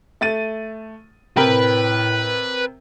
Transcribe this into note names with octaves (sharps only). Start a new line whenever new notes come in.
A3 A6 D#7
A2 C3 A#4 B4 G5